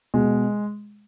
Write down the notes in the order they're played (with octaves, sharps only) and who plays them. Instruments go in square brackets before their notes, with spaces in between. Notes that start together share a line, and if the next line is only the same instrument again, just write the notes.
[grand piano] B2 G#3